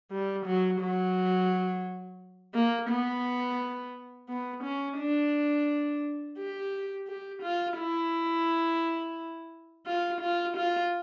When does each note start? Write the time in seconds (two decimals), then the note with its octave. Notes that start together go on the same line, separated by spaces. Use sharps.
0.11 G3
0.46 F#3
0.80 F#3
2.54 A#3
2.89 B3
4.29 B3
4.64 C#4
4.98 D4
6.38 G4
7.08 G4
7.43 F4
7.78 E4
9.86 F4
10.21 F4
10.57 F4